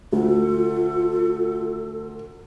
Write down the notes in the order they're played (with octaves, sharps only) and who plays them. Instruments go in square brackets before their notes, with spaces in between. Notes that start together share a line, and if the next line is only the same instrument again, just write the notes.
[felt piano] D2 [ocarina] F4 [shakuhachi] A4